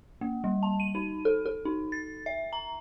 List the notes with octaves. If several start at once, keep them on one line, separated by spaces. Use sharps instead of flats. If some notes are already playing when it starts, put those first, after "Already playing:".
A#3
G3
A5
D#7
D#4
A4
A4
D#4
A6
E5
A#5